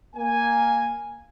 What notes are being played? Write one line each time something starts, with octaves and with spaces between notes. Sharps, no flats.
A#3 G#5